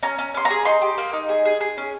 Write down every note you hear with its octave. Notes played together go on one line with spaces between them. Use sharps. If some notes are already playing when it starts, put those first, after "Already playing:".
C#4 A#5
C#4
C#4 C6
A#5
G#4
D#4 C6
G4
A#3
D#4
G#4
G#4
G#4
C#4